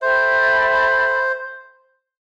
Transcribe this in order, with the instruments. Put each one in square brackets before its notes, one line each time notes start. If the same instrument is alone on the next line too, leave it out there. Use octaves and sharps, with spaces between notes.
[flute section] A4 E5 G5 B5 [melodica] C5